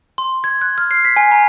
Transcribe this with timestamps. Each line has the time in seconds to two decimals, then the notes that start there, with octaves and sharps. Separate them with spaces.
0.18 C6
0.44 G#6
0.62 F#6
0.78 F6
0.91 C7
1.05 B6
1.16 G#5
1.31 A#5